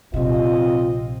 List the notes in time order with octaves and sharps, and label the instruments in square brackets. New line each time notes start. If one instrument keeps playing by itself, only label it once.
[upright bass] A#1 C3 [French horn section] C4 F4 D#5